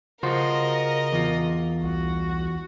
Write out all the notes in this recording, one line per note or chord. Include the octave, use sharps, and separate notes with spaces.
C#3 F4 F#4 A#4 C5 D#5
E2 F4
C2 F#4